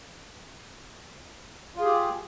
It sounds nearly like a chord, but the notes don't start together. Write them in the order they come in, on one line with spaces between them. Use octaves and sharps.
F4 G#4 G4